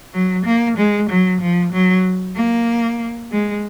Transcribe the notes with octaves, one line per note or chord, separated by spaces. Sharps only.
F#3
A#3
G#3
F#3
F3
F#3
A#3
G#3